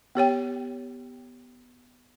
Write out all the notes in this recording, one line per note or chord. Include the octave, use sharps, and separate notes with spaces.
B3 G4 C#5 G5